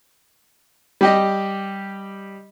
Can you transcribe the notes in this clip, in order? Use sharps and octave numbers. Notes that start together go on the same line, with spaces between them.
G3 G4 D#5